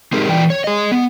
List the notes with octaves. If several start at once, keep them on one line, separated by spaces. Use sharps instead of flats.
G#3 C4 D#4 G4 G#4 A#4
E3 D5 G5
C#5
G#4 D#5
B3